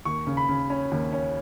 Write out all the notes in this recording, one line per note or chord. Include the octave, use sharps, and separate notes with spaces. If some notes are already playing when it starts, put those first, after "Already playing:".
D#2 C#6
C#3
B5
C#3
C#4
D#2
C#4